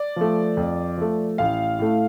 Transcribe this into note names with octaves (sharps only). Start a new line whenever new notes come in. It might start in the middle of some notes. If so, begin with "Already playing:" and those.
Already playing: D5
F3 A3
F2
F3 A3
A1 F5
A2 A3